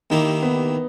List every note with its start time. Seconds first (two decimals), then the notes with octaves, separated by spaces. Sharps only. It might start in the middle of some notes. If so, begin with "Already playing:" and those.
0.10 D#2 D#3 A#3 D#4 E4 G4
0.42 B3